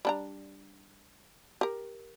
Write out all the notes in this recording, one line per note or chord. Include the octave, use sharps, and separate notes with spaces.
G3 D4 A#5
G4 A#4